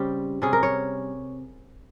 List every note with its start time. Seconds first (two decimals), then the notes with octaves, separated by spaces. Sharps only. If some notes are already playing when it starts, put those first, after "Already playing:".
Already playing: C#3 G3 C4 G4
0.42 C3 G3 C#4 G#4
0.53 A#4
0.63 C#5